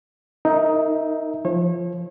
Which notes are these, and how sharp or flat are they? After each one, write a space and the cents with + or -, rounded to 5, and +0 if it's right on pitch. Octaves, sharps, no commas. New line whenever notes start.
D#4 +10 A#4 -25 E5 -5
F3 -15 C#5 -35